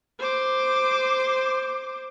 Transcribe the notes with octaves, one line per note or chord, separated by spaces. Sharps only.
C5 D6